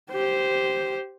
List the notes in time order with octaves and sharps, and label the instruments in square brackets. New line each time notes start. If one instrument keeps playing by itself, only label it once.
[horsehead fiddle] G4 C5